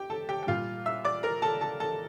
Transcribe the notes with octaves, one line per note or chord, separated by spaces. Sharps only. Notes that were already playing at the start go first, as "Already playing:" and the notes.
Already playing: G4 G5
A4 A5
G4 G5
G5
A#2 G3 F4 F5
E5 E6
D5 D6
A#4 A#5
A4 A5
A4 A5
A4 A5